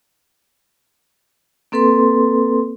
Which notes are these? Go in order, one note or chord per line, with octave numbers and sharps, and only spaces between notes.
A#3 C4 A4 B4 C6